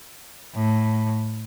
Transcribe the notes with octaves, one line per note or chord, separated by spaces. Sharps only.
A2